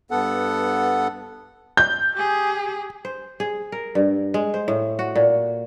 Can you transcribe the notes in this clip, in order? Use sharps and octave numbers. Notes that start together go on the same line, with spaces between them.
G2 B3 A4 F#5
G6
G4 G#4
C5
G#4
A#4
G2
G#3
C5
A2
F#4
A#2